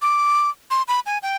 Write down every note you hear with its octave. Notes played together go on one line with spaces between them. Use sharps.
D6
C6
B5
G#5
G5